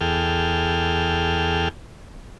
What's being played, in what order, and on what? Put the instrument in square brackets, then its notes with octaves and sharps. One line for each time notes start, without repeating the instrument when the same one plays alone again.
[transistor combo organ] E2 G#4 A4 G5 F6